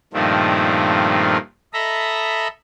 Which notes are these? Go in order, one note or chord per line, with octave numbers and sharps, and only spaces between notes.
G2 A#2 D#3 F3 A3 C4
A4 D#5 E5 A#5 B5